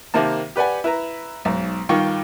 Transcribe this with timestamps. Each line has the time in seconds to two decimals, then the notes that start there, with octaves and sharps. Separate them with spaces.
0.14 C3 D#3 A#3 A5
0.56 G4 B4 D5 F#5 G#5
0.84 E4 B4 A#5
1.45 B1 G#2
1.89 G2 D#3 F4 G5 C#6